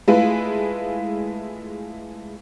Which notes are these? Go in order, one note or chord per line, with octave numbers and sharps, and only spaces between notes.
G#3 A3 E4 F4 B4